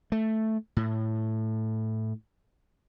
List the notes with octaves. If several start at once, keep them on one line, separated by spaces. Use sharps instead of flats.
A3
A2